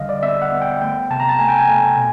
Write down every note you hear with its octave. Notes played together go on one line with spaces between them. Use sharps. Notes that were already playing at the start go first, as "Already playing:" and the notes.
Already playing: D3 G3 D#5 F5
D5
B3 E5
F#5
B3
G5
A3 G5
C3 A5
A#5
A5
A3 G#5
G5
G#5
A3
B2